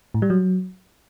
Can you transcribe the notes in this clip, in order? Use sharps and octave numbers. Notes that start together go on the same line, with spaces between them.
A2
G3
F#3